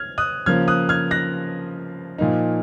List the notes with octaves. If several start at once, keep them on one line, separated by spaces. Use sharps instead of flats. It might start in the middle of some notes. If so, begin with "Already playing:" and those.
Already playing: F6 G#6
D#6 F#6
C#3 F3 A#3 F6 G#6
D#6 F#6
F6 G#6
F#6 A#6
A#2 F3 A#3 D#4